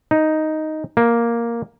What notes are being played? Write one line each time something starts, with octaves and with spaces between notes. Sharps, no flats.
D#4
A#3